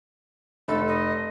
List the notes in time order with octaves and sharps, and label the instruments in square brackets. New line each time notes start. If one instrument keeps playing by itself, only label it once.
[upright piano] F1 [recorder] A4
[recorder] D#5